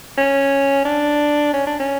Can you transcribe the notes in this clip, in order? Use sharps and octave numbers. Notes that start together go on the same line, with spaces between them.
C#4
D4
C#4
D4
C#4